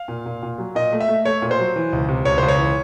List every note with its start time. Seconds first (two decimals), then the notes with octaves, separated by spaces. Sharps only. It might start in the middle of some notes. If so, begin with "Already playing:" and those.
Already playing: F5
0.08 A#2
0.26 A#2
0.43 A#2
0.58 F#3
0.75 A#2 D#5
0.92 A3
1.00 E5
1.08 A3
1.25 A3 C#5
1.42 A#2
1.51 C5
1.59 F#3
1.76 E3
1.93 C#2
2.08 C3
2.25 C#2 C#5
2.38 C#2 C5
2.49 C#5
2.58 E3